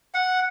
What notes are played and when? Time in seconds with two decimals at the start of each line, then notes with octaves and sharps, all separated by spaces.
0.14 F#5